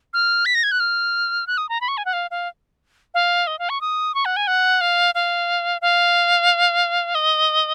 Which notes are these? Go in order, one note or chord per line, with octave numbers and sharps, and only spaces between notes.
F6
B6
A#6
G#6
F#6
F6
F#6
D#6
A#5
B5
C#6
G#5
F#5
F5
F5
F5
D#5
F5
C#6
D#6
C#6
F#5
G#5
F#5
F5
F5
F5
D#5